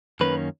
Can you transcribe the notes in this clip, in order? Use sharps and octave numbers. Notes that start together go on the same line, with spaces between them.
F#2 D#3 A#3 C#4 B4